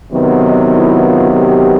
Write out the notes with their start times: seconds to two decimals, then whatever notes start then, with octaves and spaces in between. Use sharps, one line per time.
0.12 C3 D#3 F#3 B3
0.43 D#4
0.74 E4
1.05 F4
1.37 G4